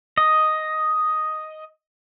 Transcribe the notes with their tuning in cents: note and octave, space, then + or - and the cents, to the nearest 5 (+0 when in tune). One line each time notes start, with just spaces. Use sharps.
D#5 +5